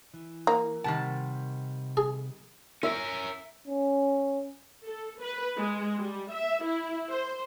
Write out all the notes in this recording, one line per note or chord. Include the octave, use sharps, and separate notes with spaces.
E3
A#3
C3 D#3 G3 F#5 A5
G#4
C#4 A#4 E5
C#4
A4
B4
G#3
G3
E5
E4
C5